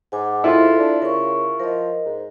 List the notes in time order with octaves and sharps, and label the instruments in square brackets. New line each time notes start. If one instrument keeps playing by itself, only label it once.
[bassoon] G#2 [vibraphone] F#5 G#5 D6
[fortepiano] E4 F4 [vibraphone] A4 C5
[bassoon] D4
[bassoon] C#3 [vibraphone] A#4 C#6
[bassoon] F3 [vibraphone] A#4 D#5
[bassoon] G#2